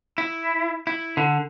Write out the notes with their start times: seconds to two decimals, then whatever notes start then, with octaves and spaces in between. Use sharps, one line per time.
0.18 E4
0.87 E4
1.17 D3